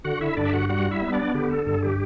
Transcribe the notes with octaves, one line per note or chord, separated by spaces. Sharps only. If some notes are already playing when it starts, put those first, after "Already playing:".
D3 F#4 F#5
E4 E5
G2 D4 D5
E5
F#4 F#5
G3 F#4 F#5
E4 E5
B3
D4 D5
D3 G4
A4
G2 A4
G4